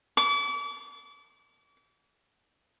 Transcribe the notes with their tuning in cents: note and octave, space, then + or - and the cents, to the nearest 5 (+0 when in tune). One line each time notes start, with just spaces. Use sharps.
D6 -40